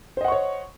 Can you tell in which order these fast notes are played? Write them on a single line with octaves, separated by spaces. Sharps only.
C5 D#5 F#5 C#6 C#5